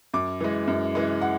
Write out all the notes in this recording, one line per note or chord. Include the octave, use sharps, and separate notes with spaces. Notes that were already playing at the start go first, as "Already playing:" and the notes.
F#2 D6
E3 G#3
F#2
E3 G#3
F#5